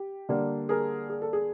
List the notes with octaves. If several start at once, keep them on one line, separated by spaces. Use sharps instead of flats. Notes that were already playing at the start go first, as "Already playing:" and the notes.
Already playing: G4
D3 G3 A#3 D4
G#4 A#4
G#4
A4
G#4